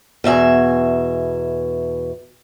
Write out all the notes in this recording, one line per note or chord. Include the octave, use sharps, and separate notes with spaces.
E2 B2 E5 G#5